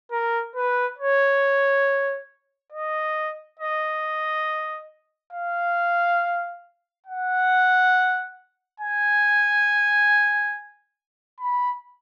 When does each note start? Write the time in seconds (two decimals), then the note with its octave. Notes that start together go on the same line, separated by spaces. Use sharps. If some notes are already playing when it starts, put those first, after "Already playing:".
0.12 A#4
0.56 B4
0.98 C#5
2.72 D#5
3.60 D#5
5.33 F5
7.06 F#5
8.80 G#5
11.40 B5